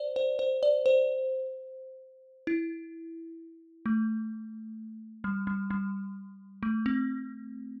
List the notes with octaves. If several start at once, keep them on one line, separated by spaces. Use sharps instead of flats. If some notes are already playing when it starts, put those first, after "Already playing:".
Already playing: C5 D5
C5
C5
D5
C5
E4
A3
G3
G3
G3
A3
C4